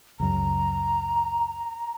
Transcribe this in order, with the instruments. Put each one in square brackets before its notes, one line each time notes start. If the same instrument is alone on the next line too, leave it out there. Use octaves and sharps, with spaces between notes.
[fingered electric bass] C#2 F#2 [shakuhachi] A#5